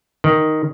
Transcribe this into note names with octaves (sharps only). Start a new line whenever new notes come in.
D#3